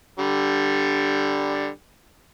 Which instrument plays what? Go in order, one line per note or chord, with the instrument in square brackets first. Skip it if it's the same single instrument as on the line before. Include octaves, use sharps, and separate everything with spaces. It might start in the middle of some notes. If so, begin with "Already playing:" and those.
[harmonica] D3 G3